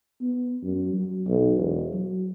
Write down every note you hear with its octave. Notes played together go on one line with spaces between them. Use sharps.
B3
F#2
F#3
B1
E1
F#3